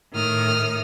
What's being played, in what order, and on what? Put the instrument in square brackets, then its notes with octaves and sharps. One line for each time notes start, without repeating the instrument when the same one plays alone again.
[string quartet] A2 D#3 D#6 F6